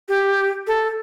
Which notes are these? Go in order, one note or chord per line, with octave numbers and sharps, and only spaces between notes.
G4
A4